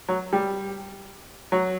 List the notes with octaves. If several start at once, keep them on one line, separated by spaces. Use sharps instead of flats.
F#3
G3
F#3